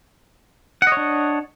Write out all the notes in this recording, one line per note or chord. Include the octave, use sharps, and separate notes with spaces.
D4 C#5 D#5 F#5